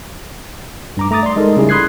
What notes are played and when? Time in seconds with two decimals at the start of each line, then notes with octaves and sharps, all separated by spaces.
0.97 G2 A#5 D6
1.11 A3 A#5 D6 D#6 A6
1.23 D5 C6
1.36 G#3 D#4 A4 A#4
1.57 C#3 G3 E4 G#4
1.69 B5 C6 D#6 F#6 G#6 C7